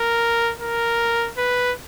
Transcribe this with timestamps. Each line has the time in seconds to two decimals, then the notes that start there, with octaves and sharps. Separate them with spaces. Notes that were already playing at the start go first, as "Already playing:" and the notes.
Already playing: A#4
0.60 A#4
1.38 B4